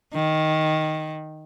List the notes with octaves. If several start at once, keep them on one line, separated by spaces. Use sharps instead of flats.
D#3